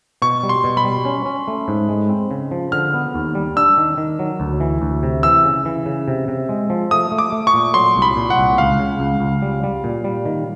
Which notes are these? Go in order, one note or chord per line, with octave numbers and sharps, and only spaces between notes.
B2 C#6
G3
C6
B2
B5
G3
C#4
C#4
A3
G#2
G#3
C4
C#3
F3
D3 F6
B3
D#2
G3
D4 E6
D#3
D#3
F#3
D2
E3
D2
C3
E3 E6
C#3
E3
C#3
C3
C3
G#3
F3
A3 D#6
A3
D6
A3
C#6
A#2
F#3 C6
C2
B5
A#2
F#5
C2
C#2 F5
C#3
C#2
C#2
G3
G3
A#2
G3
D#3